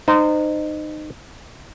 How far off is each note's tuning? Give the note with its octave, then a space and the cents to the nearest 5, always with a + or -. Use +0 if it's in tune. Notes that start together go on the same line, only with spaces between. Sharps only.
D#4 -25 C5 -20